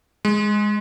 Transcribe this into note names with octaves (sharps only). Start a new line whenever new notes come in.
G#3